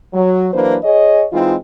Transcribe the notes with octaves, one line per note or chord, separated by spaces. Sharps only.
F#3
E3 F#3 A#3 D4 B4 C5
G#4 C#5 D#5
E3 G#3 C4 D#4 F4